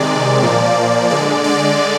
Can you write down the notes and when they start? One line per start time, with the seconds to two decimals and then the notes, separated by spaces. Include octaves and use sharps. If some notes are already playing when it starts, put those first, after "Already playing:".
Already playing: C3 D#3 G#3 D5
0.43 A#2 F3 A#3
1.10 D3 G#3 D5
1.44 D5